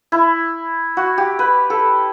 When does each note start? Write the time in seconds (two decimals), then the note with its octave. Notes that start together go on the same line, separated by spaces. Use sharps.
0.12 E4
0.97 F#4
1.18 G4
1.39 B4
1.70 A4